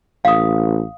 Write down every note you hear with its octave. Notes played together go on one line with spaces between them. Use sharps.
A1 F5 D#6